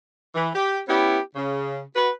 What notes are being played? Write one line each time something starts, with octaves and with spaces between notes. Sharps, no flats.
E3
G4
B3 C#4 E4 G4
C#3
F#4 B4